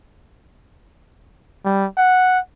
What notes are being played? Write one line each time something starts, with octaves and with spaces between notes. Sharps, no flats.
G3
F#5